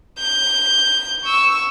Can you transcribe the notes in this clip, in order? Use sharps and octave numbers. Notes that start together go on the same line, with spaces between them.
G6
C#6 E6